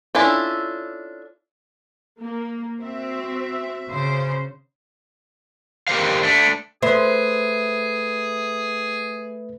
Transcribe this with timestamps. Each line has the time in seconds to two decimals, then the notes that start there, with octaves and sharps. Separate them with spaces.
0.15 C#4 D4 E4 F4 A4
2.19 A#3
2.81 C4 F#4 E5
3.89 C#3 C5
5.88 G4 A#4 C5 F5
6.23 A3 D4
6.83 A3 G#4 B4 C5 E5